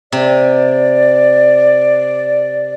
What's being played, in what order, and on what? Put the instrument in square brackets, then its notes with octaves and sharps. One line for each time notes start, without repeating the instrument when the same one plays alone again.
[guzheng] C3 [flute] D5